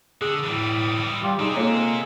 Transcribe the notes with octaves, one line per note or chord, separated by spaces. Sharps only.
D3 G#4 D#6
A2 E3 G3
G3 F4 G4
C3 G#3 C4 D#4 G#4
A#3 F4 A4 C#5